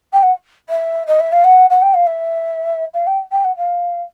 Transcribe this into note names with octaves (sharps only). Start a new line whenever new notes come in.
G5
F#5
E5
D#5
E5
F5
F#5
F#5
G5
F5
E5
F5
G5
G5
F#5
F5